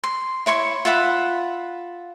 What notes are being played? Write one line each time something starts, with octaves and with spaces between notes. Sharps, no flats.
C6
E4 C#5 C6 C#6
F4 E5 F#5 B5